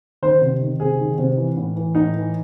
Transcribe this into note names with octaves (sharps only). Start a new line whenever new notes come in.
D#3 C5
C3
D#3
C3 G#4
D#3
C3
E3
A2
E3
A2 D#4
E3